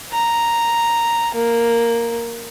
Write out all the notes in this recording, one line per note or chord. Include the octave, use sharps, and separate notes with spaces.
A#5
A#3